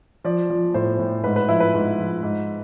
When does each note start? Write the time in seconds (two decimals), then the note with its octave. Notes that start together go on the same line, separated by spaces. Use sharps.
0.24 F3 D5
0.50 F3
0.74 A2 C5
0.99 A2
1.24 G#2 B4
1.36 B4
1.48 F3 E4
1.60 B4
1.74 G#2
1.98 F3
2.23 G#2